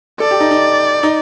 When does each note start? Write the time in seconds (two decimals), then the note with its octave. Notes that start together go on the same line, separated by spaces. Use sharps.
0.20 A4 D5
0.31 G4
0.40 D#4
0.51 D#4
1.03 D#4